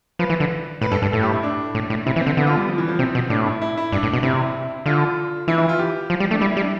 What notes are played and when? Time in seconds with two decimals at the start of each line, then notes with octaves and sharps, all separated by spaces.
0.19 F3 B4
0.30 E3
0.40 D3
0.81 A2 B4
0.91 G2 A4
1.02 G2 A4
1.12 A2 A4
1.23 G4
1.34 E4
1.43 D4
1.75 A2
1.90 A2
2.06 C3 E4
2.16 E3
2.21 C4
2.26 D3
2.37 D3 B3
2.47 F4
2.57 G3
2.68 F3
2.78 E3
2.88 F3
2.99 C3 C4
3.15 B2
3.30 A2 D4
3.46 E4
3.62 E4
3.77 E4
3.92 G2 D4
4.03 A2
4.14 B2
4.23 C3 E4
4.86 D3 F4
5.48 E3 E4
5.58 E4
5.69 F4
5.79 G4
6.10 F3
6.20 G3
6.31 A3 D4
6.40 G3 E4
6.51 E4
6.57 G3
6.61 D4